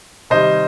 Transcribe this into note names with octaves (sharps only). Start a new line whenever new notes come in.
C3 D#3 G3 C5 D#5